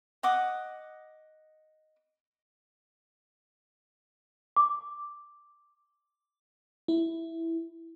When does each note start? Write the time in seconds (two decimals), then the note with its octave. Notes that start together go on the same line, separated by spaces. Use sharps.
0.23 D#5 F#5 D6 D#6
4.57 D6
6.88 E4